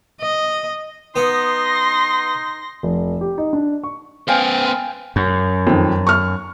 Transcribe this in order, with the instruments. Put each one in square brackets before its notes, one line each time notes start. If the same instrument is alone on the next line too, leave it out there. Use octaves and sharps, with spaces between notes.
[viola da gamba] D#5
[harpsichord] B3 F#5 [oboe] D#4 [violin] C6 A#6
[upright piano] F1
G4
D#4
D4
C#6
[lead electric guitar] B3 C5 [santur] F5 G5 G#5
[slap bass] F#2
[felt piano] F2 D#3
C#6 F6